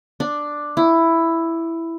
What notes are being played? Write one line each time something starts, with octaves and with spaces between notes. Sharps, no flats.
D4
E4